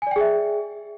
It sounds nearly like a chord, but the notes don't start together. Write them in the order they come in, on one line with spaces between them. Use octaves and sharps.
G#5 D5 G5 G#4 E5